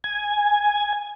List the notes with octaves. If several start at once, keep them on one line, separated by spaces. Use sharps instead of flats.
G#5